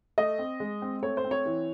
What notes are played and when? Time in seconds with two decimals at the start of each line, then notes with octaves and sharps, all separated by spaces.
0.18 A3 D#5
0.39 C4
0.60 G#3
0.82 C4
1.03 A3 C#5
1.17 C5
1.24 C4
1.31 C#5
1.46 E3